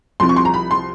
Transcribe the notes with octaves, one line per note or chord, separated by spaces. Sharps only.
C2 C3 F3 C6
C#6
C6
A#5
B5
C6